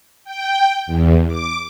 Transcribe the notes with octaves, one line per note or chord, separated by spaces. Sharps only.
G5
E2
D6